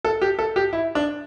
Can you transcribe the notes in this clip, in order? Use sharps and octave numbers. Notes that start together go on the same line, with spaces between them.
A4
G4
A4
G4
E4
D4